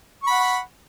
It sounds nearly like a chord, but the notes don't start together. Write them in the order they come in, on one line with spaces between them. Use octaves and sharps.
C#6 B5 F#5